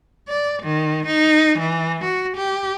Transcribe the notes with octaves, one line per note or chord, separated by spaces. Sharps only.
D5
D#3
D#4
E3
F#4
G4